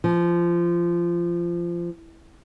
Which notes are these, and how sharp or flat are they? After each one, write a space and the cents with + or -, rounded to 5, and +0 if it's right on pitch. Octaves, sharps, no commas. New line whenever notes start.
F3 -20